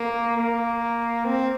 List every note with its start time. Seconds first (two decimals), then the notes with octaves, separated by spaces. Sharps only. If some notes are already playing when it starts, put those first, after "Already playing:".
Already playing: A#3
0.37 A#3
1.25 C4